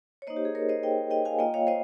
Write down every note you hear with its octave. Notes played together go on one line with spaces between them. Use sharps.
C#5
A#3 D#4 C5 D#5
G4
G#4
A#4 C#5
C5 D#5
D#5 G5
D#5 G5
F5 G#5
A#3 F4 D#5 G5
C#5 F5
C5 D#5